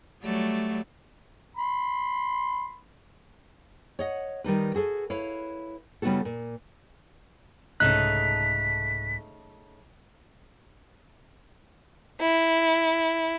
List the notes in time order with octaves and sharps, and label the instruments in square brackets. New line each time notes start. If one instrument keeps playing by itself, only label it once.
[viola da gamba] F#3 G3 A3
[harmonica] B5 C6
[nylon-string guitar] C#5 D#5 F#5
D#3 G3 D#4 B4
F#4 G#4 A4 B4
E4 B4 C#5 F5
C#3 G3 B3 D#4 F#4 A4
A#2
[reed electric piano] C2 G#2 F#6 [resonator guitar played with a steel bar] C#3 A3 D#4 [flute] B6
[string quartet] E4